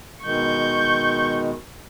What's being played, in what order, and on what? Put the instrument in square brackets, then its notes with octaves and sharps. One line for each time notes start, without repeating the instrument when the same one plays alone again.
[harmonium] B2 D#3 G#3 [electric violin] C#6 G6